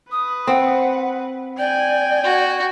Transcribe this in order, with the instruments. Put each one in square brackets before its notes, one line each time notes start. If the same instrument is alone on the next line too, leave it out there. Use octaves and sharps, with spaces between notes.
[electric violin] B4 [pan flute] D#6
[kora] C4 [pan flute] F#5
[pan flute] D5 [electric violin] G5 G#5
[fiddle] F#4